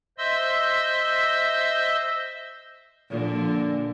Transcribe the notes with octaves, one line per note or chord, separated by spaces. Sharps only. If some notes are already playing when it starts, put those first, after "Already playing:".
C5 D#5 E5 C6 E6
A#2 D3 F3